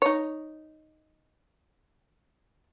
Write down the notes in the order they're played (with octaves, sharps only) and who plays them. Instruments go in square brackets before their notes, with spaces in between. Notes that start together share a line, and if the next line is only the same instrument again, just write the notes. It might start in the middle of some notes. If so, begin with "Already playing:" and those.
[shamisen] D#4 C#5